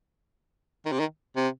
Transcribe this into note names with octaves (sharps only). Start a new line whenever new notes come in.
D#3
C3
D#3
C3